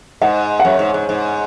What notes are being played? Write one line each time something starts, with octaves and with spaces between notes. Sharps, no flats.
G#2 D#5 F#5
F#5
F#2 C#5 E5
G#2
G#2
G#2